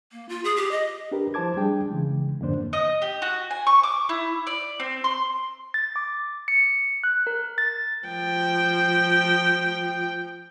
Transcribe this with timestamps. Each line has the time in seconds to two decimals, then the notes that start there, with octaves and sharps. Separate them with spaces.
0.12 A#3
0.29 F4
0.44 G#4
0.57 G4
0.71 D#5
1.11 D4 G4 A#4 B4
1.34 F3 E4 C5 A5 D6 G#6
1.57 G3 D4 G#4 G5
1.90 C#3 E3 G#3
2.41 F2 G#2 D3 A#3 D4 C5
2.73 D#5
3.02 G4
3.22 F#4
3.51 G#5
3.67 C#6
3.83 D6
4.09 E4
4.47 D5
4.80 C4
5.04 C6
5.74 A6
5.96 D6
6.48 C#7
7.04 F#6
7.27 A#4
7.58 A6
8.08 F3 G5